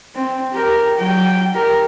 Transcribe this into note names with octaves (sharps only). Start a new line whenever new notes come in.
C4
G4 A#4
F#3 G5
G4 A#4